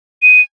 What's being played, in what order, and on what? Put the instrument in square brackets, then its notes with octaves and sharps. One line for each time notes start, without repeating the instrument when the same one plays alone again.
[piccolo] D#7